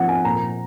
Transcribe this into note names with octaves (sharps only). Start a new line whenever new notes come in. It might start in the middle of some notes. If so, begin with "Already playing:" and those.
Already playing: F3 C4 F#5
G#5
A#2 A#5